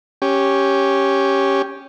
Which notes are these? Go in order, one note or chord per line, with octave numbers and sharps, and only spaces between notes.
C#4 G4